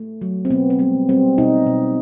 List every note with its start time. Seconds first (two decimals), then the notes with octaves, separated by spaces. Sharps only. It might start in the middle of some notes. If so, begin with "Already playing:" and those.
Already playing: A3
0.22 F#3
0.45 C4
0.50 B2 B3
0.70 C4
0.79 G3 B3
1.09 G3 C4
1.38 B2 D#4
1.67 B2